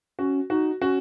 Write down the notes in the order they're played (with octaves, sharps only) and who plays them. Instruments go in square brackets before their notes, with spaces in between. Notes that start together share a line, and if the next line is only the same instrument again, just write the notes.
[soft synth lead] C#4 [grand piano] F#4
[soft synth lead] D#4 [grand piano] F#4
[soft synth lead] C#4 [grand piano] F#4